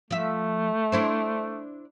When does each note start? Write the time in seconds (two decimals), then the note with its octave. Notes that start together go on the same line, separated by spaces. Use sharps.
0.11 F3 A3 E5
0.92 D4 E4 C5